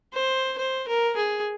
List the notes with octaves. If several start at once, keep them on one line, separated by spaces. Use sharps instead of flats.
C5
C5
A#4
G#4